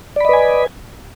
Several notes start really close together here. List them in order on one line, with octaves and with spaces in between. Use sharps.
D5 B5 D#5 B4 G#5